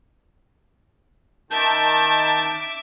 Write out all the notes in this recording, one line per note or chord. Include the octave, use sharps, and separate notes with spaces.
D#3 E5 A5 D6 G6